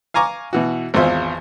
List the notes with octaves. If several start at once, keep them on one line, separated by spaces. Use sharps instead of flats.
F5 G#5 A#5 C#6 D6
B2 E3 F#4
G#1 E2 F4 C5 E5